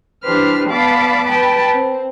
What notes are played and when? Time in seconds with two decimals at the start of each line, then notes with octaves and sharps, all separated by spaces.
0.24 E3 D4 G4 B4 C5 F6
0.69 B3 D5 F5 A5 B5 D6
1.26 B4 G5 A5 B5
1.74 C4